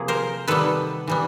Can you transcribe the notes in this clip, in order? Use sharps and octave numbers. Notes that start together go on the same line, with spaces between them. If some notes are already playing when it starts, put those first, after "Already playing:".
Already playing: C3 F3 A#3 G#4
A#4 C5
C3 D#3 G3 B3 A4 B4
E3 G3 B3